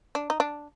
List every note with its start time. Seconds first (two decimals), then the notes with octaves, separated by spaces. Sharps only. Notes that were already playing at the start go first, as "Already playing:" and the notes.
0.15 D4
0.30 D#4
0.40 D4